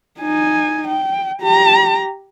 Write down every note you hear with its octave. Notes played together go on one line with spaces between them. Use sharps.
D#4 G#5
G5
G4 A#5